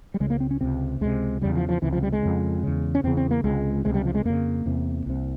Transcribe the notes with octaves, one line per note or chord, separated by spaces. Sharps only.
G3
C#2 C#3 G#3
A#3
C4
C#4
C#2 C3 C4
C#2 C3 G#3
E2 C#3 G3
F3
F3
C#2 C3 E3
F3
G3
G#3
F2 C#3
E2 C#3
C#4
E2 C#3 C4
C4
A#3
C#2 C3 G#3
C#2 C3 G#3
G3
F3
G#3
F2 C#3 A#3
E2 C3
C2 C3